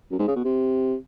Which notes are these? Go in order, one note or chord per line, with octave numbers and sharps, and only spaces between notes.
F#2
G#2
C#3
B2
C3